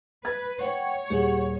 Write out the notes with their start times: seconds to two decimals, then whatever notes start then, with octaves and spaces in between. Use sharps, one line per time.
0.25 B4 G#6 A6
0.61 C#5 F#5 G5
1.10 D#1 G4 G#4 F#5